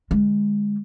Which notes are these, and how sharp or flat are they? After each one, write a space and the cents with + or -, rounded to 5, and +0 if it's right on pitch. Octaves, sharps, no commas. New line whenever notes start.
D3 +0 G#3 -20